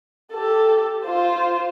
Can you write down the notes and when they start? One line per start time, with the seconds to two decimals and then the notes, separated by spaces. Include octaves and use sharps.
0.32 G4 A4
1.05 F4 C5